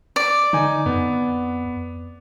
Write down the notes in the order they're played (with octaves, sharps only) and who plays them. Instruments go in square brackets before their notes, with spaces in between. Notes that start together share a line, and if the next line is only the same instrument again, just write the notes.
[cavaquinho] D5
[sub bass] D3 [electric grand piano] D#4 G#5
[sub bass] F2 [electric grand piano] B3